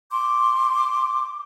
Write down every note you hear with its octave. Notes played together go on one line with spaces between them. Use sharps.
C6 D6